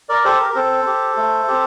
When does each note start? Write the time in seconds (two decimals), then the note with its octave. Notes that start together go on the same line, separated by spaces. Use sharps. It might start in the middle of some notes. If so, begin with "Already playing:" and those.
0.09 A#4 D5
0.24 G4 A4 C5
0.40 A#4
0.50 A#4
0.55 C4 A4 C5
0.86 G4
1.17 A3
1.48 C4 G4